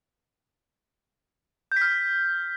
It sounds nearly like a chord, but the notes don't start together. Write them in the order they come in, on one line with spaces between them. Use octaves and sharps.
G6 B6 F6